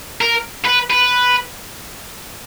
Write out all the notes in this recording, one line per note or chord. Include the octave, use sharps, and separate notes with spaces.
A#4
B4
B4